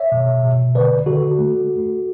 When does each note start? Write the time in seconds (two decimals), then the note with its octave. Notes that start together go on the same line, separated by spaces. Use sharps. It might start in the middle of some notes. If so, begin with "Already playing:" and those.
Already playing: C#5 E5
0.12 B2
0.43 B2
0.75 D3 B4 D5
1.06 D3 F#4 A4
1.38 A3